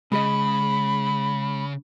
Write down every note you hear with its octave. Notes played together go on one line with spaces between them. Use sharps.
C#3 G#3 G#4 D#5 B5